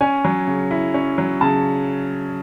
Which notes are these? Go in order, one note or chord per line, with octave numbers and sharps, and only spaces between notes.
C#4 G#5
F#3
C#3
E4
C#4
F#3
C#3 A5